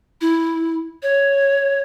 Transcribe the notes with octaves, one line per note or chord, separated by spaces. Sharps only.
E4
C#5